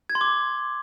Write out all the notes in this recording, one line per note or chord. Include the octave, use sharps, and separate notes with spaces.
G#6
C6
D6